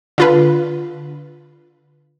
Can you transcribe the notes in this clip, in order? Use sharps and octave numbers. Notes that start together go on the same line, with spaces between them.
D3 F4 B4